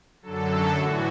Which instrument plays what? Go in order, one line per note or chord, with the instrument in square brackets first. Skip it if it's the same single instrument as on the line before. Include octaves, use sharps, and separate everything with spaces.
[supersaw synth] F#2 D3 F#3 A4
A2 E3 F#4